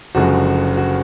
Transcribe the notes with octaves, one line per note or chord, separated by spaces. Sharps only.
F#1 F#2 D3 F3 G#3 F#4
F#4